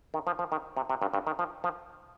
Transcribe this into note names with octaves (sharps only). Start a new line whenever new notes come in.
D#3
F3
F3
D#3
C3
C3
G2
G2
D#3
F3
F3